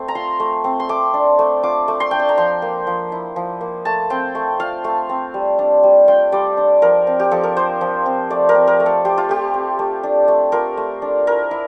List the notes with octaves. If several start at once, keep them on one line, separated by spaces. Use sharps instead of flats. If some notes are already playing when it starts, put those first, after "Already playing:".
Already playing: A3 C4
A#5
F4 C6
A3
C4
C6
A3 D6
D4
A3
F4 D6
A3
C6
D4 G5
A5
A#5
F3 C6
A#3
F3
E4
F3
A#3
A3 A5
C4 G5
A3
F4 F5
A3
C4
G3
D4
G3
F4 G5
G3 D5
D4
F3 A#4
C4
G4
F3 A4
A#4
F4 C5
F3
C4
A3 D5
A#4
C4
A#4
A3
A4
F4 G4
F4
A3 G4
C4
A3
D4
A3
F4 A#4
A3
D4
E4 A#4
E4